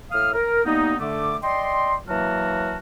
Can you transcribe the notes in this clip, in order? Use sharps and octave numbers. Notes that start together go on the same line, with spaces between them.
A2 F5 D#6 F6
A#4
G3 A#3 B3 D#4
D3 A3 D6
D5 D#5 G5 C6
E3 F#3 A#3 F#4 A#4 A5